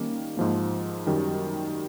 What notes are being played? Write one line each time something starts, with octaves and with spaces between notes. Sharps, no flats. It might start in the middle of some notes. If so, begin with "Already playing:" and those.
Already playing: D#3 G3 A#3 C#4
G#2 F3 A#3
F#2 D#3 G3